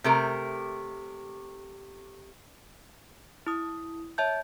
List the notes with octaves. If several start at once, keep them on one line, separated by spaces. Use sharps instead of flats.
C3 A3 A#4
E4 D#6
C#5 E5 A5 G6